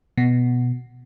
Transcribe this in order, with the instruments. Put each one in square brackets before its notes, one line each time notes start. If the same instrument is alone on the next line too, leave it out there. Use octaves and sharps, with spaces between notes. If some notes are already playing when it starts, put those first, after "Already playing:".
[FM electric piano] B2